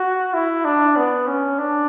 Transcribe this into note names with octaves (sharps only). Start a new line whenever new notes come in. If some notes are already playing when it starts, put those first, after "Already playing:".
Already playing: F#4
E4
D4
B3
C#4
D4